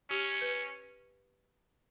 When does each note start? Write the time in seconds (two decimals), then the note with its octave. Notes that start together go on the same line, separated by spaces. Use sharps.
0.10 C#4 G4
0.41 B4